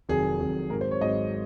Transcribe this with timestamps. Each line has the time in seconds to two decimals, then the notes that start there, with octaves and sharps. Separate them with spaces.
0.09 F1 F2 D#3 F#3 G#4
0.40 F1 F2 D#3 F#3
0.70 G#1 G#2 F#3 A#4
0.81 C5
0.91 C#5
1.01 G#1 G#2 F#3 D#5